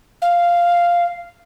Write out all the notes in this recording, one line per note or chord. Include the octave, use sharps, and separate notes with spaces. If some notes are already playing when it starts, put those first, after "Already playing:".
F5